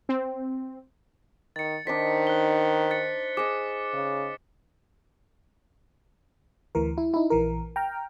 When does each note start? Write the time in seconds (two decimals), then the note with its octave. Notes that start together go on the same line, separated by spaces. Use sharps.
0.09 C4
1.56 D#3 A6 C#7
1.87 D#3 D4 D#4 C5 B6
2.27 F#6 G7
2.90 F#6 A6 C#7
3.37 G#4 D#5 D6 C#7
3.93 C#3
6.75 D2 E3 A#4
6.98 E4
7.14 D#4 E4
7.30 A#1 E3 A#4
7.76 G5 A#5 F6